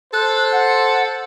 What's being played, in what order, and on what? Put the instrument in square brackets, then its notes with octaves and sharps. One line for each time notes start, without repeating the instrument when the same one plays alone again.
[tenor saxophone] A4 [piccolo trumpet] C5 [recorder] F#6
[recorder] F#5